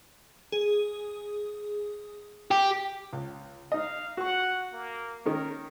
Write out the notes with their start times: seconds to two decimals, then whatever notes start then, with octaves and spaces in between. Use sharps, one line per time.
0.52 G#4
2.51 G4
3.13 C#2
3.72 D#4 D#5 F5
4.17 F#4 F#5 C#6
4.73 A#3
5.26 D#3 C#4 D#4 A#4